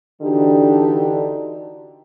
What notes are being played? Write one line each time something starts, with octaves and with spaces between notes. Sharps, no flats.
D3 E3 D4 D#4 F#4 G4